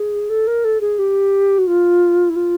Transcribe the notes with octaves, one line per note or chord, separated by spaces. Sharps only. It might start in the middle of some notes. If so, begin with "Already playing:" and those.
Already playing: G#4
A4
A#4
A4
G#4
G4
F#4
F4
E4
F4